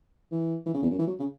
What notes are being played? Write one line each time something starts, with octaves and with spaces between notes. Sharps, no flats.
E3
E3
C#3
E2
F#2
E3
F#3
C#3